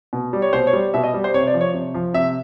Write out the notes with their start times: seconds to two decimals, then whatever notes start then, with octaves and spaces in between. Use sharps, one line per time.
0.13 B2
0.33 G3
0.42 C#5
0.53 B2 C5
0.67 C#5
0.73 G3
0.94 B2 E5
1.04 D#5
1.14 G3
1.24 C5
1.34 C3 C#5
1.47 D5
1.54 F3
1.61 C#5
1.74 C3
1.94 F3
2.14 C3 E5